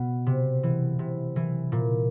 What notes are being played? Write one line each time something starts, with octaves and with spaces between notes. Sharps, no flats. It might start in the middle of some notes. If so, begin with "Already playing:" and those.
Already playing: B2 B3
C3
E3
C3
E3
A#2